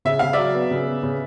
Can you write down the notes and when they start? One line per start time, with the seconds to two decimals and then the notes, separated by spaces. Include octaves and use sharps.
0.05 C#3 E5
0.19 C#3 F5
0.33 F#3 D5 E5
0.55 B3
0.71 C#3
0.86 B3
1.03 C#3